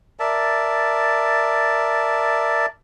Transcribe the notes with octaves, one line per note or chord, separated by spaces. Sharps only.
A#4 D5 E5 A5